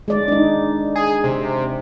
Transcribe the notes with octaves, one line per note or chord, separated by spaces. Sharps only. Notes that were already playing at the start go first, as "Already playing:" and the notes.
G#3 D5
D4 D#4
G#4
C3